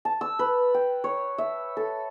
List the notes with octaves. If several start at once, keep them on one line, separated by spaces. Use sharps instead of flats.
A5
E6
B4
G5
C#5
E5
A4